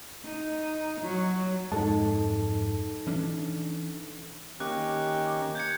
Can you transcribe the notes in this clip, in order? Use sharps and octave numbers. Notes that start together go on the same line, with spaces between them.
D#4
F#3
F2 G#2 G#3 D#4 A4 A5
E3 C#4 D4
D#3 A#3 C#4 G4 F#6
G6 G#6 C#7